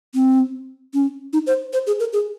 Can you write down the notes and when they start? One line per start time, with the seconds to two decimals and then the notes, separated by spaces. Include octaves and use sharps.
0.15 C4
0.94 C#4
1.33 D#4
1.47 C5
1.73 C5
1.87 G#4
2.00 A#4
2.13 G#4